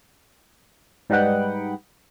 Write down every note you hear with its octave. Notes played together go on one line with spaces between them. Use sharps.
G#2 G3 D#4 B4 F#5 G5